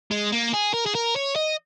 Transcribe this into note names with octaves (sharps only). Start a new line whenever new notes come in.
G#3
A#3
G#4
A#4
G#4
A#4
C#5
D#5